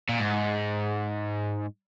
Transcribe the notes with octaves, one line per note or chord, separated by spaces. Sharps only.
A#2
G#2